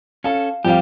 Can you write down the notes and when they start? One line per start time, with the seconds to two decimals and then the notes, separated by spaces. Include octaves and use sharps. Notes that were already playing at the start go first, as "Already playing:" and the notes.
0.24 C#4 A4 F5
0.65 F2 G3 G4 F5